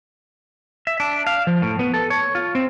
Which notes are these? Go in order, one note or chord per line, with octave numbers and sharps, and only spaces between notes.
E5
D4
F5
F3
A2
B3
A4
C#5
F4
C4